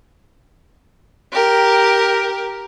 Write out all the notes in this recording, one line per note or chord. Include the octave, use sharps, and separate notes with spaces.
G4 A#4